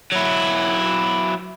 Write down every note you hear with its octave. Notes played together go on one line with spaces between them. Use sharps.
F#3 E4